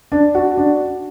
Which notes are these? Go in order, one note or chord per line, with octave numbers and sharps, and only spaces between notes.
D4
F#4
D4